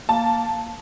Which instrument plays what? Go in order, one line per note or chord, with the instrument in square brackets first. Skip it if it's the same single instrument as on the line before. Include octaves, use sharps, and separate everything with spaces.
[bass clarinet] A#3 [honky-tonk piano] A5